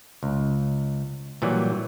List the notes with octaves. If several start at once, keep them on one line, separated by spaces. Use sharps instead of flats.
C#2
A#2 E3 F#3 G3